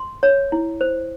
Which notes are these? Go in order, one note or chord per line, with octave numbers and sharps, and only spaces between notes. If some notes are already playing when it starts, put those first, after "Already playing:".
Already playing: C6
C#5
E4
C5